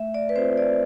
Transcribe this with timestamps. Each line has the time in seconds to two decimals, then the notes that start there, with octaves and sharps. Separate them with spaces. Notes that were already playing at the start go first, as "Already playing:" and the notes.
Already playing: A3 E5
0.14 D5
0.29 B4
0.36 C4 F4 C5
0.58 D5